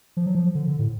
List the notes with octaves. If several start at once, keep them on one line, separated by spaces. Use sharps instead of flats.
F3
F#3
F3
D3
D3
A2